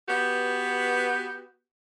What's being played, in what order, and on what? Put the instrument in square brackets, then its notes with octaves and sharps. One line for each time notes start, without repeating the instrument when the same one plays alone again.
[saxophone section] B3 F#4 G4 B4